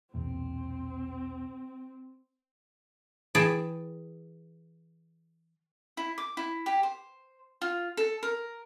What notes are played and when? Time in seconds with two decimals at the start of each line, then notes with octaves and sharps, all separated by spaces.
0.14 B1 E2 A#2 C4
3.35 E3 G#4 G5 A5
5.97 E4
6.18 D6
6.37 E4
6.66 G4
6.83 C5
7.62 F4
7.97 A4
8.23 A#4